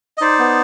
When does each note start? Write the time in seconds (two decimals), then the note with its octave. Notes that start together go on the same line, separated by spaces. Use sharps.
0.18 D#5
0.21 D#4 C5 D5
0.39 B3